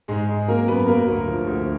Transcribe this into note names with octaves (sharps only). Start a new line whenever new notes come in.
G#2 G#3 G#4
G#2
F#3 A#3 A#4
F#2 B3 B4
F#3 A#3 A#4
D2
F3
D2